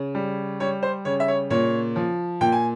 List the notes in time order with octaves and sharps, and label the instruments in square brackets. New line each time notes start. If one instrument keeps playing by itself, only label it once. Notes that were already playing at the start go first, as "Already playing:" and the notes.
Already playing: [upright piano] C#3
G3
G3 C#5
C5
C#3 C#5
E5
C#5
A#2 C#5
F3
A#2 G5
G#5